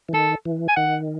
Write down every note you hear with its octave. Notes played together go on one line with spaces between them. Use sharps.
E3
D#3 A4
E3
G#5
D#3 F#5